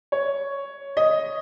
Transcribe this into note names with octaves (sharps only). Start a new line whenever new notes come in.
C#5
D#5